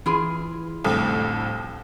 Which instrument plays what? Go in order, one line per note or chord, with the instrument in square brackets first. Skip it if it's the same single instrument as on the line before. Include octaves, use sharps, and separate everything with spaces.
[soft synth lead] E3 [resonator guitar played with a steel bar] E4 F4 G#4
[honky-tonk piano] C2 F2 D3 [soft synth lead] A2